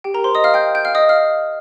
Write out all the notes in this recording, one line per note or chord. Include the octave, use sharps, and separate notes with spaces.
G4 G5
A#4 A#5
C5 C6
D#5 D#6
F5 F6
G5 G6
G5 G6
F5 F6
D#5 D#6
F5 F6